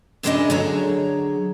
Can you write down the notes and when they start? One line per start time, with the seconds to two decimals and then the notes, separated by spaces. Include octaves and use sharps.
0.23 A#2 C#3 G#3 D4 E4 D#5
0.50 D3 F#3 G#4 C#5 A#5